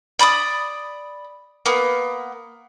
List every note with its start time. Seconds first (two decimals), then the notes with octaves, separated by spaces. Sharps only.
0.19 D5 B5 D6 D#6
1.66 A#3 B3